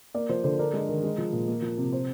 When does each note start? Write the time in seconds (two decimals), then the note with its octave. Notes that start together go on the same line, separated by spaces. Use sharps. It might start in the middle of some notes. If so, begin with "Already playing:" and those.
0.14 A#3 D5
0.29 F3 C5
0.44 D3 C5
0.59 D4 A#4
0.73 G#3
0.89 D#3
1.03 G#3
1.18 F3
1.32 A#2
1.48 A#3
1.62 F3
1.77 C3
1.93 C5